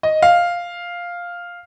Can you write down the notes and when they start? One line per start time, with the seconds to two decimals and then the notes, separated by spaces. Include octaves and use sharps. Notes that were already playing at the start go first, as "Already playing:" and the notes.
0.03 D#5
0.22 F5